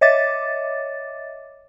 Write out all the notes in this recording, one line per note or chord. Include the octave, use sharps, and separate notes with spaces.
C#5 D#5 E5 D6 A6